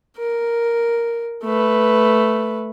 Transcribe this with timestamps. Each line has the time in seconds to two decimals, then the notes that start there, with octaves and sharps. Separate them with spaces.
0.19 A#4
1.44 A3 B4